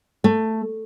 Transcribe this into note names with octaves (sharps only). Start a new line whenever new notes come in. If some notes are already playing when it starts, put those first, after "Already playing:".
A3